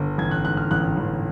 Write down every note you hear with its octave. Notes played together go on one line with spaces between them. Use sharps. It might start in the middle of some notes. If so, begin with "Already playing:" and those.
Already playing: G1
A1 G#6
F#6
G#2 F#6
F6
A1 F#6
A1